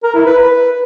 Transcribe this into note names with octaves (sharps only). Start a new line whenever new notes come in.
A#4
E4
B4
B4